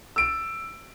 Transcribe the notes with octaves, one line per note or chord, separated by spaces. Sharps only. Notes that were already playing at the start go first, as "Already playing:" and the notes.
E6 D7